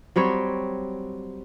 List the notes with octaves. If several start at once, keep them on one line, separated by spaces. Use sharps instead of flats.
F#3 G3 C4 C#5